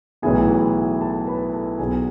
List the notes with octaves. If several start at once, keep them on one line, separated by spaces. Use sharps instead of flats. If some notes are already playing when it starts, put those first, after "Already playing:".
B1 A2 E3 B3 G#4 G#5
A4 A5
B4 B5
A4 A5
B1 B2 B3 G#4 G#5